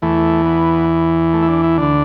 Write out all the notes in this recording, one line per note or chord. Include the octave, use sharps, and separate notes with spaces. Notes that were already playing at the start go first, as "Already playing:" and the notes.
E2 E3 A3
B3
A3
E4
D4
E4
D2 D3 D4